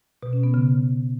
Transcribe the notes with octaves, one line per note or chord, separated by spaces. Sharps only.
B2
C#4
B3
C#3